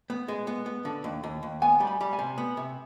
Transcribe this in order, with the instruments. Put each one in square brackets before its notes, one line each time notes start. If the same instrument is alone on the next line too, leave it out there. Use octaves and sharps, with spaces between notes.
[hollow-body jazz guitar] B3
G#3
B3
B3
D3
D#2
D#2
D#2
[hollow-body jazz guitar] B3 [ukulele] G#5
[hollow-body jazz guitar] G3
[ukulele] B5
[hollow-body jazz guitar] G3
[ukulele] G#5
[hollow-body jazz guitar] C3
B3
C3